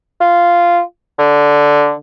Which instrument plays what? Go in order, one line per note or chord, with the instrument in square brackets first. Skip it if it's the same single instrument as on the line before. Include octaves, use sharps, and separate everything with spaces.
[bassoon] F4
D3